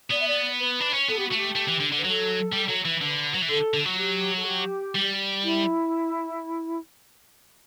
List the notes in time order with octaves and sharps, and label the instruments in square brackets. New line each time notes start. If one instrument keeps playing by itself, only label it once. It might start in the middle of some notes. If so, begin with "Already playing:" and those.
[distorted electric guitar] B3 [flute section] D5
[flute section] E5
D5
B4
[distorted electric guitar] D4
C#4
[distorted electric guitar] B3 [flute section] A4
[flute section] G4
[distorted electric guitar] A3 [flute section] F#4
[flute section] G4
[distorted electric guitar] A3
E3
D3
D3
[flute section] B4
[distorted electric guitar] F#3 [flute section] A4
[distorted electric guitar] G3
F#3
E3
[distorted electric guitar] D3 [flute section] B4
[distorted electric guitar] F#3
E3
[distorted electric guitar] D3 [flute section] A4
[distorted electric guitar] D3
F#3
[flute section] F#4
G4
A4
G4
[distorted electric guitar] G3
[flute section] E4